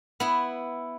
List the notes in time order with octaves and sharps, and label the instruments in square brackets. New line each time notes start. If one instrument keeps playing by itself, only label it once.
[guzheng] B3 E4